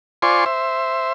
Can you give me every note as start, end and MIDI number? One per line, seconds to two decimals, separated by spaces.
0.22 0.45 65
0.22 0.45 72
0.22 0.45 74
0.22 0.45 80
0.22 0.45 84
0.22 0.45 85
0.46 1.13 72
0.46 1.13 76